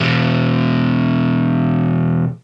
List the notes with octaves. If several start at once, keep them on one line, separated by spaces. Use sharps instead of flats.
E2 B2